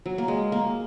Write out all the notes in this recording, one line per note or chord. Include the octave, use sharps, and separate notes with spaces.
F#3
A#3
G#3
A#3